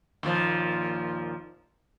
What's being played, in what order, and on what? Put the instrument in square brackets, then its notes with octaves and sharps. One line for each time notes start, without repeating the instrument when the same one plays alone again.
[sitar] D#2 A#2 F3